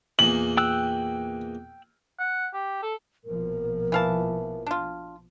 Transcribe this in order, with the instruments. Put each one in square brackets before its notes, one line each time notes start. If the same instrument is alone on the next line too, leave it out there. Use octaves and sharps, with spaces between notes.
[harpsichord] E2 A#2 [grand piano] F#7
[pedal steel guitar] G5 E6 F#6
[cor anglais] F#5
G4
A4
[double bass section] A#1 B2 F3 [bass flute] A#4
[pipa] E3 F5 A5
D4 F4